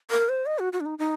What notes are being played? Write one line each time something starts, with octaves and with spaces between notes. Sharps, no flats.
A#4
C5
D#5
F#4
F#4
D4
D#4
D#4